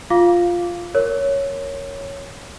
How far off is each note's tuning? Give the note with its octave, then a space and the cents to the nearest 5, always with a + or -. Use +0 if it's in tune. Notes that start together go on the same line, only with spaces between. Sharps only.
F4 +0 F5 +0 D6 -10
A#4 +0 C#5 +0